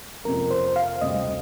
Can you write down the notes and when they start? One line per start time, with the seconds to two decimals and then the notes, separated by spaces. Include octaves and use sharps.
0.24 F2 C3 F3 A#3 A#4
0.51 C5
0.76 F5
1.01 D2 C3 G3 C4 D#5